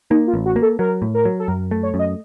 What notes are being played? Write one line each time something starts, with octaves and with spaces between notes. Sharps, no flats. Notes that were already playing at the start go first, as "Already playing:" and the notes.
A#3 D#4
F4
A1
F#4
A#3
A4
F#3 A#4
A2
A#4
F#3
A4
F#2 A#4
A3
C#5
F#2
D#5